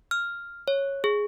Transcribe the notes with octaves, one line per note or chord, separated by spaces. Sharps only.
F6
C#5
G#4